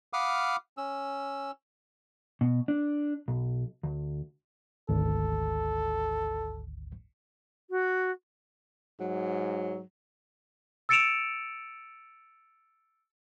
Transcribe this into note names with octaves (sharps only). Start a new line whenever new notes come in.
F5 F#5 B5 D6 D#6 F6
C#4 E6
B2
D4
B1
D2
G#1 D2 A4
F#4
G#2 F#3
E6 A6 C#7 D7 E7 F7